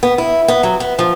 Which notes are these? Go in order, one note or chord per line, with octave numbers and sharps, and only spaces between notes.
B3
E4
B3
F#3
B3
F3